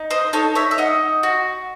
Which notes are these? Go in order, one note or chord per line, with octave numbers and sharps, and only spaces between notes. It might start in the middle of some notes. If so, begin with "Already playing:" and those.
Already playing: D#4
C5 D#5
D#4 A4 C#5
C#5 E5
E5
D#4 D#5 F#5
F#4